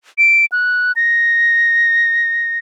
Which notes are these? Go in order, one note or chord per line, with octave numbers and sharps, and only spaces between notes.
D7
F#6
A#6